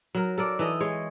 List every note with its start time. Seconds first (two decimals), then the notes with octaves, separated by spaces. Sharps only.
0.15 F#3 A#4
0.38 A4 A#4 D5
0.59 E3 A4 D#5
0.80 G#3 C#5